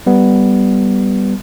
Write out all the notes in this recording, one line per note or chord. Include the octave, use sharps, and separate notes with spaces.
G3 B3